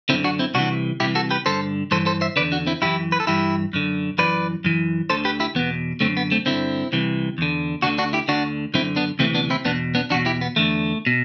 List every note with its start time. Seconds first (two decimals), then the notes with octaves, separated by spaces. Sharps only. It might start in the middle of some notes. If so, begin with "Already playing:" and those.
0.09 D3 C4 E4
0.13 F#2
0.24 D4 F#4
0.39 C4 E4
0.54 C2 C3 E3 D4 F#4
1.00 C2 C3 E3 E4 G4
1.15 F#4 A4
1.31 G4 B4
1.46 G2 D3 A4 C5
1.91 G2 E3 A4 C5
2.06 A4 C5
2.21 C5 E5
2.36 E2 D3 B4 D5
2.52 D4 F#4
2.67 C4 E4
2.82 F#2 E3 E4 G4
3.12 B4
3.20 A4
3.27 G2 E3 E4 G4
3.73 F#2 D3
4.18 F#2 E3 B4 D5
4.64 F#2 E3
5.10 D2 D3 A4 C5
5.25 G4 B4
5.40 E4 G4
5.55 E2 B2 B3
6.00 F#2 D3 A3 C4
6.17 B3
6.31 A3 C4
6.46 G2 D3 C4 E4
6.93 C2 C3 E3
7.38 E2 D3
7.82 D2 D3 D4 F#4
7.98 D4 F#4
8.13 E4 G4
8.28 D2 D3 D4 F#4
8.74 F#2 D3 C4 E4
8.96 B3 D4
9.19 D2 C3 E3 A3 C4
9.35 B3 D4
9.50 C4 E4
9.65 E2 B2 B3 D4
9.95 B3 D4
10.10 E2 D4 F#4
10.14 B2
10.26 E4 G4
10.41 B3
10.56 E2 D3 A3
11.06 B2